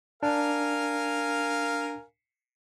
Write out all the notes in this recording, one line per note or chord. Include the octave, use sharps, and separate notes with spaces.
D4 A#4 F5 G#5